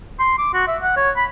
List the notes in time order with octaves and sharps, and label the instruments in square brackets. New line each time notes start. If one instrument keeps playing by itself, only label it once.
[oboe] C6
D6
F#4
E5
F#5
C#5
B5